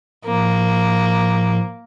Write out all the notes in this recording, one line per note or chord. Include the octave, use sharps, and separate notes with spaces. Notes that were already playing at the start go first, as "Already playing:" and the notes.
A2 F3 A#3